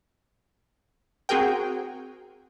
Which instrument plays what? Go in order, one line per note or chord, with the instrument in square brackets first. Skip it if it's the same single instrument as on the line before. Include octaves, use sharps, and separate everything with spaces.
[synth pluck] C4 F#4 G#4 A#4 G5